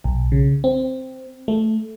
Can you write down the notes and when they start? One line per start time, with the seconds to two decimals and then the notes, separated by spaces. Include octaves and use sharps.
0.04 B1
0.32 C#3
0.64 C4
1.48 A3